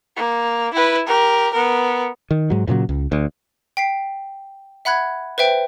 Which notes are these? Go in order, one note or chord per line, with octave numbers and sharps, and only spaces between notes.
A#3
E4 B4
G4 A#4
B3 A#4
D#3
G#2 F#3
G2 A#2 C#3 F#3
C#2
D2
G5 B6 C7
E5 F#5 B5 F#6 G#6
B4 C5 E5 G5